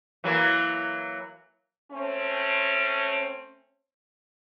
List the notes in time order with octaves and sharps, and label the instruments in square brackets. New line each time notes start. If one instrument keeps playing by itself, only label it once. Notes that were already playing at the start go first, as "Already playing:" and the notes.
[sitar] E3 F#3 A#3
[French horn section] A3 C4 C#4